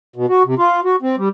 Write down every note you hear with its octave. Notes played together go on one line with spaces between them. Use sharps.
B2
F#4
C3
F4
F#4
C4
G3